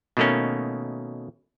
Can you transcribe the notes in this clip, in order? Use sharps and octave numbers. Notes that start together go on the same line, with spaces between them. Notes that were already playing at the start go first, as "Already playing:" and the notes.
B2 D#3 A3 A#3 C#4